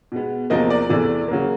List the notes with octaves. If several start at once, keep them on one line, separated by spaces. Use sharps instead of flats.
B2 G#3 B3
E2 C3 F3 A#3 D#5
D5
E2 C3 E3 A3 D5
C#3 F#3 A#3